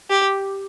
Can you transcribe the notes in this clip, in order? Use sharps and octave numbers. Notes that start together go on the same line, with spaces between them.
G4